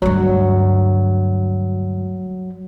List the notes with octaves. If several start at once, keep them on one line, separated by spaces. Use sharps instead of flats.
D2 G2 F#3